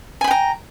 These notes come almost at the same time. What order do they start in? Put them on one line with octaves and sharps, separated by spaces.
G#5 B5 G5 A#5